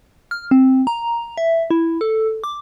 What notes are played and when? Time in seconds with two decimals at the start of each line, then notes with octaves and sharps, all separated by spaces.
0.31 F6
0.51 C4
0.87 A#5
1.38 E5
1.71 E4
2.01 A4
2.44 D6